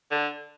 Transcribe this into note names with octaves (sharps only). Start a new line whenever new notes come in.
D3